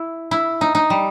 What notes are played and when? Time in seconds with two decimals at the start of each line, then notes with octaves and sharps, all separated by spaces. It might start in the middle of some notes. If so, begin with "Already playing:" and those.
Already playing: E4
0.31 E4
0.61 D#4
0.75 D#4
0.90 G3